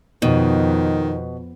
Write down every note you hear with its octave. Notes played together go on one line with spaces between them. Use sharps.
F2 B2 D#3